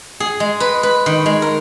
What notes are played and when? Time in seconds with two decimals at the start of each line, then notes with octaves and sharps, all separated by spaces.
0.20 G#4
0.40 G#3
0.60 B4
0.83 B4
1.06 D#3
1.26 G#3
1.42 A#4